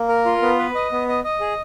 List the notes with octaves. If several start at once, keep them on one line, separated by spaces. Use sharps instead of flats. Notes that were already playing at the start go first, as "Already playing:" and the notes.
Already playing: A#3
A#4
F4
B3
B4
D#5
B3
D#5
D#5
G#4